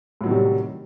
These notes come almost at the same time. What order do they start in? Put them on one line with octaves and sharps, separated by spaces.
A2 F#3 D#3 C3 G3